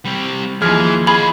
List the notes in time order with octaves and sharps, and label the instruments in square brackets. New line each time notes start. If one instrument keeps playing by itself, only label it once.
[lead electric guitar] G3 C4
[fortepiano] D#2 F3 F6 [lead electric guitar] E3 [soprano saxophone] G#4
[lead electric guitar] F4 D#5 [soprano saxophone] G#4 [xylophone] B5